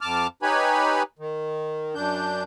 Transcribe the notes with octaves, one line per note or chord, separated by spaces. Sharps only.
F2 A5 D6 F6
D#4 G4 B4 C#5 G#5 B5
D#3
F#2 D4 G6